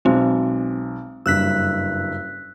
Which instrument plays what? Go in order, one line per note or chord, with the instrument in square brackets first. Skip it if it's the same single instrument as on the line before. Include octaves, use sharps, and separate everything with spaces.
[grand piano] B1 [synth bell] G#3 C4
[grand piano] F#1 G2 [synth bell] E6 F#6 B6